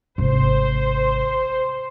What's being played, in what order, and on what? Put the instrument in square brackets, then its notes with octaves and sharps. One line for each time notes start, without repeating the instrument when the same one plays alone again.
[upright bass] G#1 C3 [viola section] C5